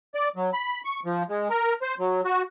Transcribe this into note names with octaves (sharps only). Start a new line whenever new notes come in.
D5
F#3
B5
C#6
F3
G#3
A#4
C5
F#3
F#4